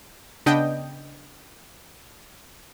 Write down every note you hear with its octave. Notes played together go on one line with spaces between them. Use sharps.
C#3 B3 D4 D#5 G5